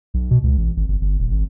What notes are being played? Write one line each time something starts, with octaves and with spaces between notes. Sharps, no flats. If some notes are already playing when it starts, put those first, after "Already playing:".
B1
B2
C#2
A1
G#1
G1
G1
D#1
G#1